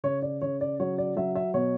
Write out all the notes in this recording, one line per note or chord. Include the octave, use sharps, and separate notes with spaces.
C#3 C#5
D5
C#3 C#5
D5
F#3 C#5
D5
F#3 E5
E5
B2 C#5